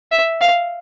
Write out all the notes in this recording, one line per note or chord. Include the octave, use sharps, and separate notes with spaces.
E5
F5